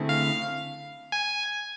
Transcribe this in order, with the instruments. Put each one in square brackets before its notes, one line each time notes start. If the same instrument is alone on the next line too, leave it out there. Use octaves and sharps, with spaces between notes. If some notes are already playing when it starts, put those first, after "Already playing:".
Already playing: [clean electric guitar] D3 A3 C4 E4 G#4
[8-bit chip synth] F5
G#5